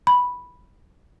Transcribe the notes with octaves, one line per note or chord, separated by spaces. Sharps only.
B5